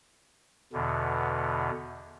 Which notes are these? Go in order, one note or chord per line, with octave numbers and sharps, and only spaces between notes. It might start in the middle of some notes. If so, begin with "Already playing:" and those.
E2 B2 D3